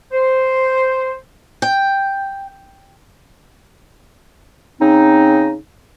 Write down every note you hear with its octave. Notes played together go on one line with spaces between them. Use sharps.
C5
G5
C#3 C4 D#4